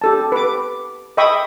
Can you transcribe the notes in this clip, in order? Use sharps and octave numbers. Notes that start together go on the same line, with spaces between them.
G4 A4 A5
B4 D6
D#5 E5 G5 B5 C#6 D#6